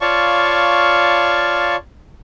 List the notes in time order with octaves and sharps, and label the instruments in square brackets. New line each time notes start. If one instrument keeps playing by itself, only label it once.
[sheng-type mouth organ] F4 C#5 D5 F5 A5 C#6